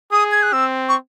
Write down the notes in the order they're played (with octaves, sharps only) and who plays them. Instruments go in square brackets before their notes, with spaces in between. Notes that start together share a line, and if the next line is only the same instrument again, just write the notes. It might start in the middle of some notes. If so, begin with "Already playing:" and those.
[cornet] G#4 [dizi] D#6
[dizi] G#6
F#6
[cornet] C4 [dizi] E6
[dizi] C#6